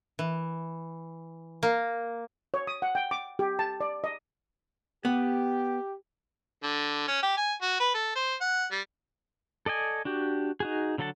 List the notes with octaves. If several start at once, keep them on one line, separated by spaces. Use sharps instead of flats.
E3
A#3
C#5
D#6
F#5
G5
D6
G4
A5
D5
D#5
B3 G4
D3
C#4
G4
G#5
F#4
B4
A4
C5
F#5
G3
A4 D5 D#5 G#5
D4 F#4 G4
D#4 F#4 G#4
D3 F#3 A4 F#5 A5